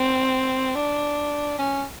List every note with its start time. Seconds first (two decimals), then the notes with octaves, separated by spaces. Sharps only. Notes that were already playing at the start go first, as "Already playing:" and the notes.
Already playing: C4
0.75 D4
1.59 C#4